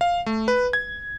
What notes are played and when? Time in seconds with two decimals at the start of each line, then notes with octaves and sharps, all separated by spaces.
0.01 F5
0.26 A3
0.48 B4
0.73 G#6